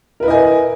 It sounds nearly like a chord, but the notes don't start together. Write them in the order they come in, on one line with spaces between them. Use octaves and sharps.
A#4 B4 E4 D#5 G#5